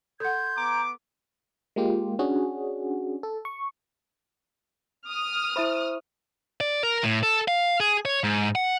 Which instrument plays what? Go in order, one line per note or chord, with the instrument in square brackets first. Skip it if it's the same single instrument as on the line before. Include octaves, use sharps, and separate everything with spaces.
[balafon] A4 F#5 [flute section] C6 G6 G#6
[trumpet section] B3 D6 [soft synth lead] A#5
[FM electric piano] G#3 A#3 F4 G4
C#4 D4 F#4 G#4
A4
C#6
[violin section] D#6 F6
[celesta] E4 E5 B5 [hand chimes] C5 C#6
[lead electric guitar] D5
A#4
A2
A4
F5
G#4
C#5
G#2
F#5